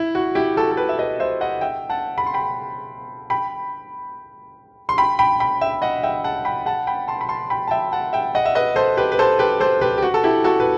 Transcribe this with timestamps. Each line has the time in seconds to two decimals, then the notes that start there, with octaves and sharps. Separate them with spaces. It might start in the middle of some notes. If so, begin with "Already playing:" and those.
Already playing: E4
0.15 F#4
0.35 E4 G4
0.57 F#4 A4
0.71 A4
0.77 G4 B4
0.89 E5
0.99 B4 D#5
1.20 C5 E5
1.41 D#5 F#5
1.61 E5 G5
1.90 F#5 A5
2.18 B5
2.26 C6
2.34 G5 B5
3.30 G5 B5
4.89 C6
4.98 G5 B5
5.19 G5 B5
5.40 G5 B5
5.61 E5 G5
5.82 D#5 F#5
6.03 E5 G5
6.24 F#5 A5
6.45 G5 B5
6.66 F#5 A5
6.87 G5 B5
7.08 A5 C6
7.21 B5
7.29 A5 C6
7.50 G5 B5
7.68 A5
7.71 E5 G5
7.92 F#5 A5
8.13 E5 G5
8.35 D#5 F#5
8.46 E5
8.55 B4 D#5
8.76 A4 C5
8.97 G4 B4
9.12 B4
9.19 A4 C5
9.39 G4 B4
9.60 A4 C5
9.81 G4 B4
9.98 G4
10.02 F#4
10.14 A4
10.24 E4 G4
10.44 F#4 A4
10.60 B4